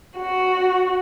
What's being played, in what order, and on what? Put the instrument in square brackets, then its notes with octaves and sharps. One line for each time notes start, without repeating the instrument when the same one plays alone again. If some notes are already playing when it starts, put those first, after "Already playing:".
[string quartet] F#4